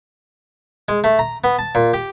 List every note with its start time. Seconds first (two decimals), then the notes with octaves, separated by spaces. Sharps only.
0.89 G#3
1.04 A3
1.19 A#5
1.44 B3
1.59 A5
1.75 A#2
1.94 G4